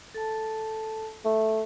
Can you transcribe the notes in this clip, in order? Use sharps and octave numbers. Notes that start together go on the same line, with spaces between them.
A4 A5
A3 E5